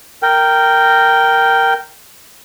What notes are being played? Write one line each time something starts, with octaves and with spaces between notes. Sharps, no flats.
A#4 G5